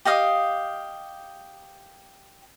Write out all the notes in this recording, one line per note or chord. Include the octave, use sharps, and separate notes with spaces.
G4 D#5 F5 D#6